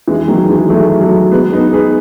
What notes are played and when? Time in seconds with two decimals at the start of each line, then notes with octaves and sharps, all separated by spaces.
0.08 E3 G#3
0.28 D#3 F#3
0.49 E3 G#3
0.70 F#3 A3
1.01 F#3 A3
1.32 G#3 B3
1.53 B3 D#4
1.73 G#4 B4